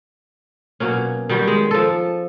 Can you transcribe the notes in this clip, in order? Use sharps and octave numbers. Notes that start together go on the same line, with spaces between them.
B2 F#3 A#3 C#4
D#3 F#3 G3
G#3
F3 A4